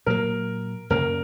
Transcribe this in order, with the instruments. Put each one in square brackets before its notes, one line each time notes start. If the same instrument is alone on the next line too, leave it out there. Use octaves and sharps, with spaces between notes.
[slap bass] A#2 F#3 A#3 [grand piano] A#4
[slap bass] F#2 C#3 A#3 [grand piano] A#4